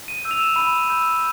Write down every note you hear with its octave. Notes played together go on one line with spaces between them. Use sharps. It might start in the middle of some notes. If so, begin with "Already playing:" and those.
D#7
E6 G6
F7
E7
B5 D#7
E6 G6